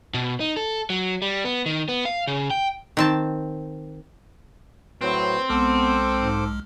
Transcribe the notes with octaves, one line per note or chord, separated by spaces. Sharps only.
B2
D#4
A4
F#3
G3
B3
D#3
B3
F5
C#3
G5
D#3 C4 A5
A2 F#3 C4 B4
B1 G#3 B3 A4 C5 D6 F6
G#2